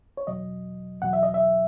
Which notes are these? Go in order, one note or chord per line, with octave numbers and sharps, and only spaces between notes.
C#5
E2 B2 F#3 D#5
E2 B2 F#3 F#5
E5
D#5
E5